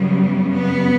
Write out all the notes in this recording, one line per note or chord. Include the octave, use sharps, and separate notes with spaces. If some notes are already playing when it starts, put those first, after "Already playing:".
Already playing: F#2 C#3 G3 B3
B3